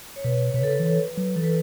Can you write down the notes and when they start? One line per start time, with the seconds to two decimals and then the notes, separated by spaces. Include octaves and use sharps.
0.16 C#5
0.24 B2 B4
0.37 B4
0.49 C#5
0.54 B2 B4
0.61 C#3 A4
0.70 B4
0.80 E3
1.17 F#3
1.36 E3 A4
1.44 B4